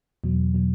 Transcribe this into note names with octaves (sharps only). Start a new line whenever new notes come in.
E2 B2 F#3
B2 F#3